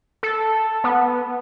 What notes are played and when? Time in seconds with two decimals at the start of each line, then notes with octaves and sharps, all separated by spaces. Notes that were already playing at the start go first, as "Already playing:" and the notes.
0.23 A4
0.84 B3